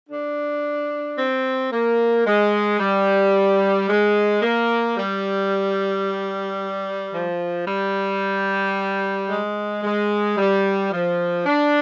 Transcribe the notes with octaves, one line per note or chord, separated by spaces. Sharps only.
D4
C4
A#3
G#3
G3
G#3
A#3
G3
F3
G3
G#3
G#3
G3
F3
D4